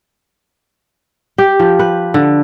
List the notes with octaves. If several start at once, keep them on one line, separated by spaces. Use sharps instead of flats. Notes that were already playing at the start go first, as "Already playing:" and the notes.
G4
F3
B4
D3